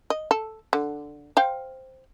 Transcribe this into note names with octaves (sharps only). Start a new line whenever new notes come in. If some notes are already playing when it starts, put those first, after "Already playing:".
D#5
A4
D3
C5 F5 G5